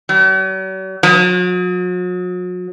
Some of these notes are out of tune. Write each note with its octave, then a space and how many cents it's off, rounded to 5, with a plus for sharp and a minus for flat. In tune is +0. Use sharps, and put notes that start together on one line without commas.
F#3 +45
F#3 -40